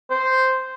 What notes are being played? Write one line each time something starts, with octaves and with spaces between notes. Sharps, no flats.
C5